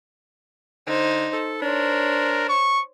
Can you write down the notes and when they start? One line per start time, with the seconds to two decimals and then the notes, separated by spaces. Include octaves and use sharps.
0.87 D3 D#4 C5
1.33 A4
1.62 D4 A#4 C5 C#5
2.49 C#6